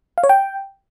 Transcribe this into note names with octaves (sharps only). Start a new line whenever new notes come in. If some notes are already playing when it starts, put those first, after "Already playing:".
F5
C#5
G5